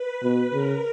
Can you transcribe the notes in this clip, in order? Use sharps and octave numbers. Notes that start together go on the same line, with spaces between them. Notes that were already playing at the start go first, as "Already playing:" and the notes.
Already playing: B4
B2
C#3 A#4